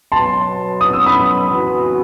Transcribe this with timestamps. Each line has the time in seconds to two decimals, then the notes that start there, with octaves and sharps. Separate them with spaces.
0.12 B2 F#3 B3 A5 C6
0.81 D#6
0.93 E6
1.06 B5 D#6
1.50 E3 B3 F#4